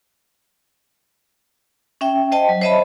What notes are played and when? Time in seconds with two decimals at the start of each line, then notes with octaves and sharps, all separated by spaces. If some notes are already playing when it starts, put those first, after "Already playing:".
2.01 C#4 E5 G5
2.32 C5 D#5 G5 A5
2.49 F#3
2.61 C5 C#5 D#5 E5 A5 B5